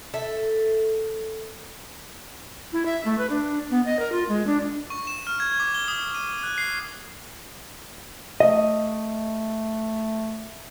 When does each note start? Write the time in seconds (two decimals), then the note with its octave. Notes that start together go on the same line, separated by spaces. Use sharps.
0.14 A4 E5
2.73 E4
2.86 E5
3.05 A3
3.18 B4
3.30 D4
3.71 B3
3.86 D#5
3.99 A#4
4.12 F4
4.29 G#3
4.47 D4
4.90 C#6
5.07 E7
5.27 F6
5.40 G#6
5.60 D6
5.75 G7
5.88 D#6
6.14 D#7
6.43 F#6
6.58 C7
8.40 A3 D#5